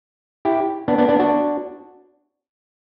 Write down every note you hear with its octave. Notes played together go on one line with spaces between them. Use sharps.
E4 G4
B3 D4
B3 D4
B3 D4
D4 F#4